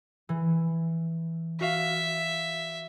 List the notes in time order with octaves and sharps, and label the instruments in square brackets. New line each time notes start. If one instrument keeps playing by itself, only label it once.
[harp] E3
[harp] F#4 F5 [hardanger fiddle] E5